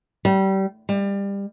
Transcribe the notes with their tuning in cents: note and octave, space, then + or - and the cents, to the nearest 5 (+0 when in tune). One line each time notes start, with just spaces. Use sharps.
G3 -25
G3 +25